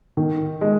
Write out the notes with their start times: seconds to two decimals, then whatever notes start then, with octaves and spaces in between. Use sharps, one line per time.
0.17 D#3
0.61 G#3